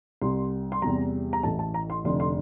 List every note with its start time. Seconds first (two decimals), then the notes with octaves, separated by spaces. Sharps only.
0.22 C2 C3 G3 C6
0.72 C6
0.82 E2 C3 G3 A#5
1.33 A#5
1.43 A1 A2 E3 A5
1.59 A5
1.74 A#5
1.90 C6
2.05 F1 F2 D3 C6
2.20 C6